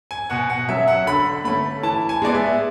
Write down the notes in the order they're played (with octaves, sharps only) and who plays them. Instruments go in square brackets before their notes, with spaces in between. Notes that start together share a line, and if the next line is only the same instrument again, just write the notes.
[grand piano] G#5
B2 F#5
F#5
F#3 C#4 E5
F#5
D3 B5
A3 C#4 B5
E3 A5
G#5
G#3 B3 D5
E5